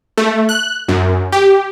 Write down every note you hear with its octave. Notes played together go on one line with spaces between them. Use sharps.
A3
F#6
F#2
G4